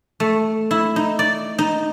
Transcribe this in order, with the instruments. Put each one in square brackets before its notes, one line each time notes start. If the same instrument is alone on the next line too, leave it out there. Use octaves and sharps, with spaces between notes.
[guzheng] A3
E4
D#4
D5
D#4